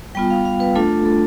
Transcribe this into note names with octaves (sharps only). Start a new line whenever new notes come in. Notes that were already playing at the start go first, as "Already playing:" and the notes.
G3 B3 F4 G5
F5
F5
B4
A3 D4 F4 A4
A4